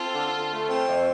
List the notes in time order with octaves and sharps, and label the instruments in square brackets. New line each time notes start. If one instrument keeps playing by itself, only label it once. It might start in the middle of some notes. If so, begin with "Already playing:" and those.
Already playing: [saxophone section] C4 [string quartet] F4 A4
[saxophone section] D3
D3
A3
C4
F2